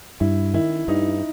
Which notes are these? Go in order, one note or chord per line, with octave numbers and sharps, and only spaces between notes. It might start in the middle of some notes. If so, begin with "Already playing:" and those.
G2 E4
D#3 E4
G2 D#4